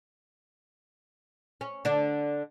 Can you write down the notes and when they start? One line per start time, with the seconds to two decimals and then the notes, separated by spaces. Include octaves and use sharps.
1.61 C#4
1.85 D3 D4